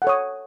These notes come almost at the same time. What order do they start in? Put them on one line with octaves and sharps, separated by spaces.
F#5 A4 C#5 D#6